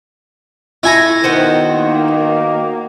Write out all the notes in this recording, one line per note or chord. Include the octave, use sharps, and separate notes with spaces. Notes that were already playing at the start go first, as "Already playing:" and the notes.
A3 E4 G#5 A#5
D#3 B3 F#4 C5
A#3